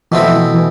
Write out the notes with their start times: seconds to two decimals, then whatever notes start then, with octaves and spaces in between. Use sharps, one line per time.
0.11 B2 E3 A3 C4 E4
0.23 F3
0.36 E3
0.54 E3